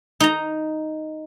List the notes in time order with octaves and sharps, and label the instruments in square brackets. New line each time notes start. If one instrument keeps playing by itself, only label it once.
[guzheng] D#4 A#5